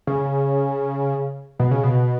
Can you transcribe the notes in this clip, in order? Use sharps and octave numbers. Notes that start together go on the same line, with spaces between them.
C#3
B2
C#3
B2